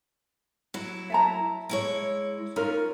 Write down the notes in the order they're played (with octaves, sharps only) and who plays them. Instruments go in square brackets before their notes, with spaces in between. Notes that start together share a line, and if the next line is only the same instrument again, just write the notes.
[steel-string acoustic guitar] F#3 E4
[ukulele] E5 A5 A#5
[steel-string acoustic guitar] G#3 E4 C#5
[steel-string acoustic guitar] C#4 [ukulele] D#4 F4 A#4